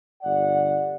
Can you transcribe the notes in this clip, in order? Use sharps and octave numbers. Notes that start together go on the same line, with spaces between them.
G1 D5 F#5